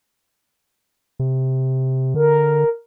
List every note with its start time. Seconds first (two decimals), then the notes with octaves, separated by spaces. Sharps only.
1.19 C3
2.15 D3 A#4